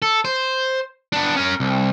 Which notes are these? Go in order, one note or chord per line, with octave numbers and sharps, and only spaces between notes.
A4
C5
B3 D4
C#4 A#4
C2